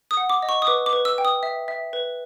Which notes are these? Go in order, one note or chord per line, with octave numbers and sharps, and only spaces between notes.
D#6
F#5
D6
D#5
C#6
D#6
B4 D6
D6
B4
E6
G5
D#6
E5
E5
B4